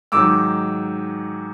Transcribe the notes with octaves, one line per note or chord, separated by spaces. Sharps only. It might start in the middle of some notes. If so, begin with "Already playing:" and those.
G#2 D#3 F#3 D6 E6